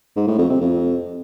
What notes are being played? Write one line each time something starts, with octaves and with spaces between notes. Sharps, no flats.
G#2
A2
F2
C3
F2